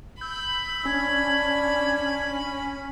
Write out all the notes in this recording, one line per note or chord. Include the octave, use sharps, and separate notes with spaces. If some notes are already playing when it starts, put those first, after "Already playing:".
B5 E6 G6
C#4 D4 G#6